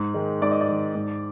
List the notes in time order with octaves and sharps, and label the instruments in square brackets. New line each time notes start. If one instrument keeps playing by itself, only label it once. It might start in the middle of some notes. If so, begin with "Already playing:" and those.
Already playing: [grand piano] G#2
D#3 G#3
G#2 D5
D#5
D5
D#3 G#3
G#2